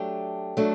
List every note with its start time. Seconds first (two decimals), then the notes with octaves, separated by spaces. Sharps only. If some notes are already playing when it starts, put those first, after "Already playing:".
Already playing: F#3 A3 D4 G4
0.57 F#3 A3 D4